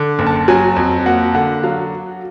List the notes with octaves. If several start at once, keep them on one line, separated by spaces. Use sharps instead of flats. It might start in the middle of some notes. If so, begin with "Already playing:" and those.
Already playing: D3
F#1
A5
F#3 G#5
F2
A#3 F#5
D3 F#5
F#3 F5